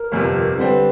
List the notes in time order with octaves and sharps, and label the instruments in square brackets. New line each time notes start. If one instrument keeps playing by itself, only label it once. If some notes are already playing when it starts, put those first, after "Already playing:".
Already playing: [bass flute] A#4
[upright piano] G1 F2 C3
[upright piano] D3 G3 C4 [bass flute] B4